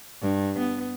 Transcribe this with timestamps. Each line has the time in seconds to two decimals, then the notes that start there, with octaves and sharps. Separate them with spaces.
0.22 G2
0.59 B3